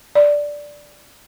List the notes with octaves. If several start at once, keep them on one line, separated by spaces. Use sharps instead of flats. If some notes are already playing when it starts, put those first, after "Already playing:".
D5